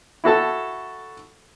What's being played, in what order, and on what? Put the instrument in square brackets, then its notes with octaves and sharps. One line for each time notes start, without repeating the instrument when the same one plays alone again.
[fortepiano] E4 F#4 A4 A5